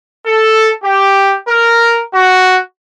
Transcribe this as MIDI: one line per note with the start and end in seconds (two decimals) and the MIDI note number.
0.25 0.70 69
0.82 1.36 67
1.48 1.99 70
2.13 2.57 66